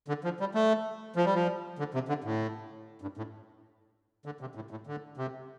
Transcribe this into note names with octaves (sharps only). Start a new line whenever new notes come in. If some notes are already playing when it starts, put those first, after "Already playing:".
D3
F3
G3
A3
F3
G3
F3
D3
C3
D3
A2
G2
A2
D3
C3
A2
A2
D3
C3